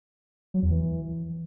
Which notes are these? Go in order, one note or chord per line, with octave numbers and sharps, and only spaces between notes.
F#3
E2
E3